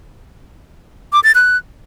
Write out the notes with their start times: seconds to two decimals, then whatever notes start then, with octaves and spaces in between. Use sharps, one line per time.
1.13 D6
1.24 A6
1.35 F#6